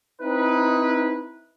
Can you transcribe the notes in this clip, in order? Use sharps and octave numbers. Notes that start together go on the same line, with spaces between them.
C4 D#4 E4 B4